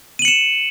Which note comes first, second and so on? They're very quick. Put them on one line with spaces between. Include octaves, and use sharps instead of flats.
D#7 F#7 C#7 E7